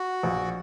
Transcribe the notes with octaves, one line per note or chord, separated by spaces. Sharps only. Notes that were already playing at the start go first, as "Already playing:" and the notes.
Already playing: F#4
A#1